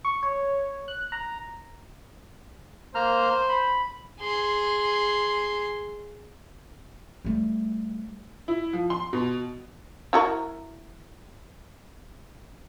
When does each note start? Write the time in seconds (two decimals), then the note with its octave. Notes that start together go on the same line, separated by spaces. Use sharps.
0.05 C#6
0.23 C#5
0.88 F#6
1.12 A#5
2.95 A#3 C5 A#5 F6
3.49 B5
4.20 G#4 C6
7.25 G3 A3
8.48 E4
8.73 F3
8.90 C6
9.13 B2
10.13 E4 F#4 A#4